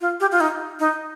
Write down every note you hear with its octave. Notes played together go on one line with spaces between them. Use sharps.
F4
G4
F4
D#4
D#4